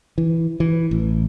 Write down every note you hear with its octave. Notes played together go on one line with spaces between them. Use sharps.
E3
E3
A1